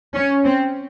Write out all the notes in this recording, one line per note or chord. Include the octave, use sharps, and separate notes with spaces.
C#4
C4